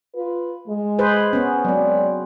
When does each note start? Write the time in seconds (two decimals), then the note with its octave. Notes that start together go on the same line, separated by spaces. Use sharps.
0.15 F4 B4
0.68 G#3
0.99 G#4 B4 C5
1.33 B3 C#4
1.65 F#3 G#3 C4 G#4 D5